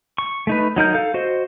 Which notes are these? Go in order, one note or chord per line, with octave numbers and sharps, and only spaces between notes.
C#6
A3 D#4 B4
F#3 D#4 A#4 G6
A4 F5
F#4 C5 D#5